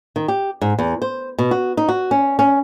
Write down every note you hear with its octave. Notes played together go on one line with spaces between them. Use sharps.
D#3
G4
G#2
E2
C5
B2
F#4
D#4
F#4
C#4
C#4